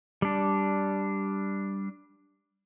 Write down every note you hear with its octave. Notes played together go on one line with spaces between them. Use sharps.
G3 D4